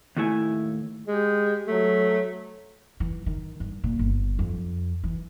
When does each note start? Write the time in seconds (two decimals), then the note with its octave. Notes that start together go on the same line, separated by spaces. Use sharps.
0.17 D#2 A2 A3 E4 G#5
1.08 G#3 G4
1.68 F#3 A3
3.00 E3
3.26 D#3
3.60 G2
3.84 A#2
3.99 G1
4.39 F2
5.04 E3